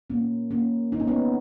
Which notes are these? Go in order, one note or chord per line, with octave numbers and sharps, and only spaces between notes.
A#3 C#4
A#3 C#4
D#4
C#4
B3 D#4